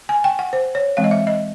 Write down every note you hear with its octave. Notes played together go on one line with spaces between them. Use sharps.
G#5
G5
F#5
C5
C#5
E3 G#3 C4 F5
D#5
E5
D#5